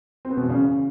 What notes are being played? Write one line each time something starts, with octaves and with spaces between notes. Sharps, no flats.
C4
B3
B2
E3
C#3